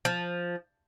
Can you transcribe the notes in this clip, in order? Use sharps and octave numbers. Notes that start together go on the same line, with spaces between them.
F3